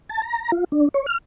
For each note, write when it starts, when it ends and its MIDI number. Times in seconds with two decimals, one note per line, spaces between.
0.09 0.22 81
0.22 0.51 82
0.52 0.64 65
0.72 0.88 62
0.94 1.06 73
1.06 1.18 89